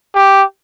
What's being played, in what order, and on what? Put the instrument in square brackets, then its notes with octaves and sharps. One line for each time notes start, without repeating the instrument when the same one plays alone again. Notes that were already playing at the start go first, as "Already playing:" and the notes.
[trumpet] G4